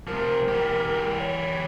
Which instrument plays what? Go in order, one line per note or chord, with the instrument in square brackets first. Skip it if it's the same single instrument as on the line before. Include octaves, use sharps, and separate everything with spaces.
[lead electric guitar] C3 F3 [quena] A#4
[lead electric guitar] E3 G4
[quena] C#5